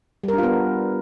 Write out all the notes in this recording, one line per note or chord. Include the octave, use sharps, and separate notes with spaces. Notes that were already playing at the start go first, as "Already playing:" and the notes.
G3 B3 D4 F4 A#4